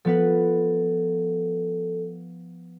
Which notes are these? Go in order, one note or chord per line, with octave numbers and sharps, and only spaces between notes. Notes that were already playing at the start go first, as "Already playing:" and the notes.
F3 B3 A4 B4